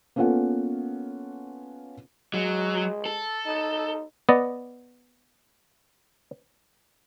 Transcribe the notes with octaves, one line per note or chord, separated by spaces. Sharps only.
A#3 B3 C#4 F4 A4 F#5
F#3 G#3
A4
D#4
B3 D5 D#5